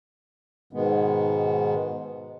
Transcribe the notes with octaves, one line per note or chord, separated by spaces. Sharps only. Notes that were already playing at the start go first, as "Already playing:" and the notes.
G#2 B2 D#3 G#3 B3